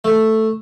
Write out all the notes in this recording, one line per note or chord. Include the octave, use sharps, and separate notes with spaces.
A3